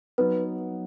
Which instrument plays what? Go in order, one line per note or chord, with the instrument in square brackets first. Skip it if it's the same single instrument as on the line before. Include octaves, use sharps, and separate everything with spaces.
[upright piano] F#3 B3 D#4 [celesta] B4